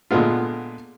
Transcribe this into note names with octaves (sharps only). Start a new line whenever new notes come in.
A#2 D3 G#3 B3 F4